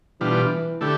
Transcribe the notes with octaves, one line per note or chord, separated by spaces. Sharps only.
B2 E3 G3 D4 F4
D3 A3 E4 G4